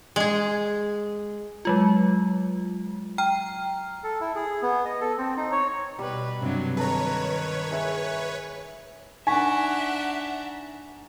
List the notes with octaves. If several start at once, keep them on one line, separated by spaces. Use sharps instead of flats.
G#3 G#4
F#3 G#3 F4
G5 A#5 F6
A4
E4
G#4
B3
D#5
A4
C4
D#4
C#5
B2 G3 B4
G2 C3 F#3
D#3 A4 B4 C#5 A#5
G#4 E5 G#5
D4 D#4 E5 F#5 G#5 A#5 C#6 B6